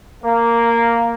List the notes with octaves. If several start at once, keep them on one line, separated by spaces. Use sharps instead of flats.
A#3